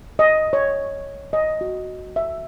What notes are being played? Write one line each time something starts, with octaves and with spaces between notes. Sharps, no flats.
D#5
C#5
D#5
F#4
E5